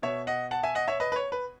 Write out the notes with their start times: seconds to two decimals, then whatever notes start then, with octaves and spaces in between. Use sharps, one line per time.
0.02 B2 C#5 E5
0.27 D#5 F#5
0.51 F#5 A5
0.63 E5 G#5
0.75 D#5 F#5
0.88 C#5 E5
1.00 B4 D#5
1.12 B4
1.16 C#5
1.32 B4